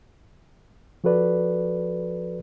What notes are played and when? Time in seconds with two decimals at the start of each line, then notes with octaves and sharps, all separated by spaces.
1.04 F3 F#4 A4 B4 D5